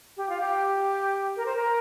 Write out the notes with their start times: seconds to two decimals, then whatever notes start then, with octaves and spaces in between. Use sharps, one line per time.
0.17 G4
0.29 F4
0.40 G4
1.36 A#4
1.46 C5
1.56 A#4